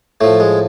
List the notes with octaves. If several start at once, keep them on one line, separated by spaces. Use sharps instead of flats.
A2 F3 A3
G#3